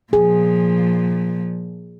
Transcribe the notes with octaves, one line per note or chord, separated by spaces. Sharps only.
A#2 F3 G#4